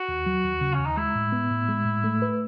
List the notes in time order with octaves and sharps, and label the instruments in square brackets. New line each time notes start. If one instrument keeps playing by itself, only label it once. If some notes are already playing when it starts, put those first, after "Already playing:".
Already playing: [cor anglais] F#4
[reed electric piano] D#2
F#3
D#2
C#3
[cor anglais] C#4
[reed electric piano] D#2
[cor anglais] D#4
[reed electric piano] G#3 [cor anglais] E4
[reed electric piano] A2
B3
A2
G#3
A2
A3
B4